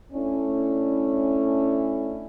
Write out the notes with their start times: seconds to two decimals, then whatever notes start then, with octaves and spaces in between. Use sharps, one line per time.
0.12 A3 C#4 D4 E4